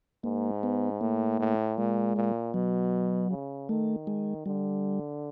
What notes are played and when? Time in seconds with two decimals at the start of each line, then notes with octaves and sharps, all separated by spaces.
0.24 G#2 A#3
0.63 B3
1.01 A2 A#3
1.40 A2
1.78 A#2 G#3
2.16 A#2
2.54 B2 F#3
3.31 C#3
3.69 D#3 A3
4.07 G#3
4.46 D3 G3